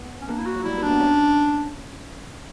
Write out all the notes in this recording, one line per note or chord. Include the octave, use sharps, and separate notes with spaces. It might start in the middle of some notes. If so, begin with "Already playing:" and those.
Already playing: B3
C#4
A#3 D4
E4
F#4
F#3
G3 E4
A#3 D4
B3
C#4